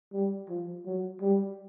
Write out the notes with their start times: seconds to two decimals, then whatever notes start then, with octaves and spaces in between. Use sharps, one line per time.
0.13 G3
0.49 F3
0.85 F#3
1.21 G3